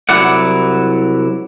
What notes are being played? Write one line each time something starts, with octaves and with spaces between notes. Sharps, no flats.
C2 F#3 E4 D5 F#5